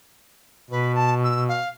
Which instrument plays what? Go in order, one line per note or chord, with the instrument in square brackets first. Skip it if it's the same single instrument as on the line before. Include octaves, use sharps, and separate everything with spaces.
[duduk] B2 [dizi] B4
[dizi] A5
E6
F5